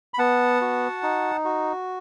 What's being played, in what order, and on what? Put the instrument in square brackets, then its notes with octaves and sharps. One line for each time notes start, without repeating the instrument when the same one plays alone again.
[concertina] B5
B3 F#5 A5
F#4
D#4
F#4